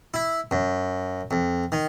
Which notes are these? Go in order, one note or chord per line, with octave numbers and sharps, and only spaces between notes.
E4
F#2
F2
D#3